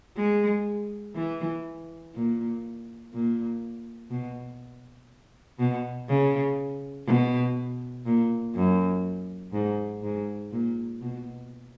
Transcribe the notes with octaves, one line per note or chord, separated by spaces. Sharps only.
G#3
E3
A#2
A#2
B2
B2
C#3
B2
A#2
F#2
G#2
G#2
A#2
B2